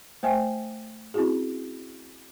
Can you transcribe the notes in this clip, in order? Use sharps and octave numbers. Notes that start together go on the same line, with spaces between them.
A3 C5 E5 G5 G#5
C4 C#4 E4 F#4 G#4